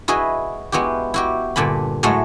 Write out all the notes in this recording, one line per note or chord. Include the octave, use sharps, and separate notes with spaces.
E4 F#4 G#4 B4 D#5
G#3 B3 E4 F#4 G4
E4 F#4 G4
G2 A#2 D3 G#5 B5
A2 F#3 G#3 A3 F#4